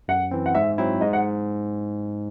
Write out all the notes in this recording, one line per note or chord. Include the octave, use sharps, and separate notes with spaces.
F#2 F#5
E3 C4
F#5
G#2 E5
F#3 C4 E4
G#2 D#5
F#5